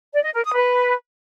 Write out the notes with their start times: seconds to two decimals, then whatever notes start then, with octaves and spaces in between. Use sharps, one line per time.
0.13 D5
0.23 D#5
0.34 A#4
0.44 D#6
0.54 B4